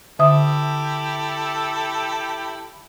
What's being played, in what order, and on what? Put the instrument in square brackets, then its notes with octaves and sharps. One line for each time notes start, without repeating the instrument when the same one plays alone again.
[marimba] D3 E5 D#6 [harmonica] E4 G4 A4